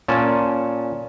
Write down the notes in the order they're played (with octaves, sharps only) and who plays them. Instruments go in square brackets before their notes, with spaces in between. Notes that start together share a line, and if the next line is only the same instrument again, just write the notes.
[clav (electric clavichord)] A#2 C#4 A5